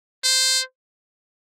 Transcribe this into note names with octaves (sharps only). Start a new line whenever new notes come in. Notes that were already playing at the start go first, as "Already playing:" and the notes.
C5